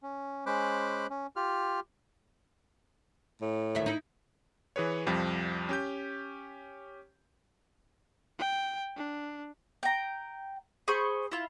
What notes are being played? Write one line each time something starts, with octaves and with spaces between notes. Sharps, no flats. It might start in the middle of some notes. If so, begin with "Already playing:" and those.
C#4
G#3 C#4 C5 B5 D6 F#6
C#4
F4 G4 F6
A2
D2 D#3 E5
D#4 E4
E3 G#4 B4 C#5
C2 F2 F3 G3
C#4 G4 G6
G5
D4
G5 A#5
G#4 C5 B5 C#6
E4 F4